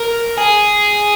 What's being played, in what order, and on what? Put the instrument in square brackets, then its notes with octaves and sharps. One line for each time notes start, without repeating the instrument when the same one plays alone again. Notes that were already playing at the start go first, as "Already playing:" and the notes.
Already playing: [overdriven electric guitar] A#4
G#4